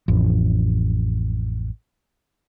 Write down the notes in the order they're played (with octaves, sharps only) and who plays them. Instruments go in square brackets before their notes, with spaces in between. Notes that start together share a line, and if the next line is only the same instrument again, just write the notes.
[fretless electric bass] A1 F2